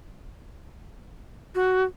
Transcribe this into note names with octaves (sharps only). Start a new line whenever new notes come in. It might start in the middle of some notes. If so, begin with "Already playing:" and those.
F#4